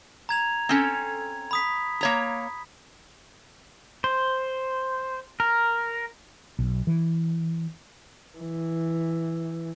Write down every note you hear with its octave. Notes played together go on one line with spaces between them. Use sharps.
A#5 G#6 F7
C4 C#4 A4
B5 D#6 B6
A#3 C#5 A#5
C5
A#4
B1
E3
E3